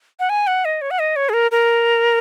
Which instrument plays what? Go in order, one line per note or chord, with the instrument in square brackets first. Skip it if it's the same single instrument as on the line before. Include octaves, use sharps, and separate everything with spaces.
[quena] F#5
G#5
F#5
D#5
C#5
F#5
D#5
C#5
G#4
A#4
A#4